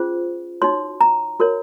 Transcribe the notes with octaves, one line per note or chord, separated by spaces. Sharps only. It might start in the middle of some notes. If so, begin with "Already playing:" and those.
Already playing: C#4 F4 G#4 C5
D#4 F#4 C#5 C6
A#5
F#4 A#4 C#5